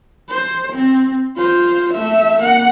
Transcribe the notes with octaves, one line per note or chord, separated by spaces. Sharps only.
C5
C4
F4 C5
A3 E5
A#3 F#5